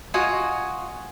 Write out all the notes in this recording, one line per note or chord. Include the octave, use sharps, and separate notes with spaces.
F4 F#4 D#5 G#5